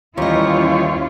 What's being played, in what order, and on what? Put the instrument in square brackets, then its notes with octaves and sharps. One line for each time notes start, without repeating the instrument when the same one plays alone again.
[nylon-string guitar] D#2 D#5 [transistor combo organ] E3 G3 C#5 [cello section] C#4 E4 F4